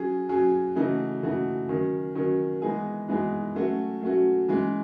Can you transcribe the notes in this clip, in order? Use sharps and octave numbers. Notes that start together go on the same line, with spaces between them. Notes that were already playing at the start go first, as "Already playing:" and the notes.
Already playing: F#3 C#4 G#4
F#3 C#4 G#4
C#3 E3 A3 D#4 F#4
C#3 E3 A3 D#4 F#4
D#3 F#3 C#4
D#3 F#3 C#4
E3 G#3 B3 D#4 G#4
E3 G#3 B3 D#4 G#4
F#3 A3 C#4 F#4
F#3 A3 C#4 F#4
E3 G#3 C#4